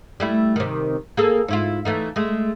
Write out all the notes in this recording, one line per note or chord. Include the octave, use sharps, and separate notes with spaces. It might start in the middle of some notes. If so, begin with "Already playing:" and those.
G3 A3 E4
C3 D#3
A#3 G#4 A4
G#2 E4 F4
E3 A3 D#4
G#3 A3